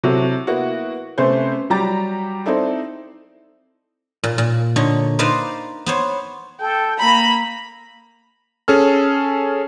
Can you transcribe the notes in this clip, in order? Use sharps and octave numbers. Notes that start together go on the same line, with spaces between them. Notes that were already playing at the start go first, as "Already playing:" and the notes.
C3 F#3 E4 F#4 A4
A#3 B3 E4 F#4 F#5
C3 A3 C#4 B4 C5
F#3 G3 G4 A#5 A6
C4 D#4 E4 A4 D5
A#2
A#2
D3 D#4 C#5
D#4 B4 C5 D5 F5
B3 C5 C#5
A4 G5
A#3 A#5 B5
C#4 G#4 A4 F6